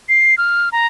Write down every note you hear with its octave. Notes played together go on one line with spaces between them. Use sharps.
C7
F6
A#5